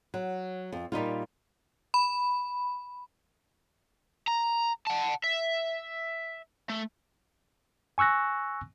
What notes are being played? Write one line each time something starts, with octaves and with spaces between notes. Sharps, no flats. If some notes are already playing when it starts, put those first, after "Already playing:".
F#3
F2
A#2 G3 D#4 F4
B5
A#5
F#5 A5
E5
A3
G#5 C#6 E6 F#6 A#6